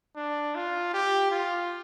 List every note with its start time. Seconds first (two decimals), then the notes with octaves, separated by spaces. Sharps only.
0.16 D4
0.55 F4
0.94 G4
1.32 F4